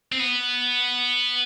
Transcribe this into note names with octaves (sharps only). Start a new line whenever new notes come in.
C4
B3